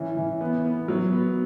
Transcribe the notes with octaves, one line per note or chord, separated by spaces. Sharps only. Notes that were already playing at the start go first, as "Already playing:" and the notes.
Already playing: E3 C#4
E3
B3
B3
F#3
B3